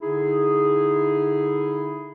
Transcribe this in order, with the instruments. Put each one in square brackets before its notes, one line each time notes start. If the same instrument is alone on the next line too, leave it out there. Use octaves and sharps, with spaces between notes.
[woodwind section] D3 D#4 E4 G#4